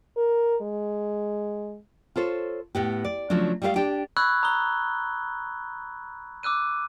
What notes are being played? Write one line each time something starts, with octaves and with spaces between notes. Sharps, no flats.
A#4
G#3
F4 A4 C5 C#5
A2 B3 G4
D5
C#3 F3 F#3 A3 D4
G3 A3 G4 C5 F5
D4 G4 G5
B5 C#6 E6 F#6 G#6
A#5 D#6 G7
D6 E6 F#6 D#7